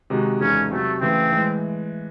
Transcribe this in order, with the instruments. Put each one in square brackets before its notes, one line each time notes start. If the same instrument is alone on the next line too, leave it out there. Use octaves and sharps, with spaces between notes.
[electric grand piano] C3 D#3 G#3 D#4 F#4
[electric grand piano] E2 C#3 G#3 D#4 A4 [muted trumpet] C#4
[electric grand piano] C3 F#3 C4 F#4 [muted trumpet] A3
[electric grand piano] C#3 E3 A3 [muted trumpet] C4
[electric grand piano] A2 E3 G#3